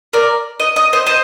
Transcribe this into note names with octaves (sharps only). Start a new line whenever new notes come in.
A#4 D5
D#5
D#5
C5 D#5
C5 D#5